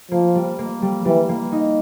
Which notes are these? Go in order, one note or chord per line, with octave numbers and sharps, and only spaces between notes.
F3 A#3
G3
A#3
G3
E3 G3
A#3
D#4